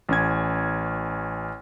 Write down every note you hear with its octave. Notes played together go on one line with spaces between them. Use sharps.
A1 C#4 G#6